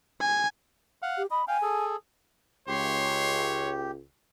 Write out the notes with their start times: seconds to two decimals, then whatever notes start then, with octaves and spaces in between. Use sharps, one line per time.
0.21 G#5
1.02 F5 F#5
1.18 G4
1.31 D#5 B5
1.48 F5 G5 G#5
1.62 G#4 A4
2.68 C#2 G4 C#5 C6